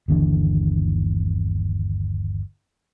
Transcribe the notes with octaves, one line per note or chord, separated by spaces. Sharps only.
G1 D#2 D3 E3